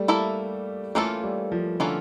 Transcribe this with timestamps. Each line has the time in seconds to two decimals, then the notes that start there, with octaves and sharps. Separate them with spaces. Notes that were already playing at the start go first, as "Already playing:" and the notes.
Already playing: G3 A3
0.08 A#3 E4 A4 E5
0.95 E3 A3 A#3 C#4 F4 A4
1.24 G3
1.52 F3
1.80 D3 E3 A#3 C#4 F4 A4